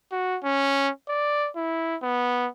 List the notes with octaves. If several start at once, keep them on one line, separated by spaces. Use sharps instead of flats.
F#4
C#4
D5
E4
B3